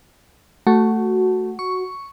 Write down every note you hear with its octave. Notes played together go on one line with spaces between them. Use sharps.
A3 F#4
C#6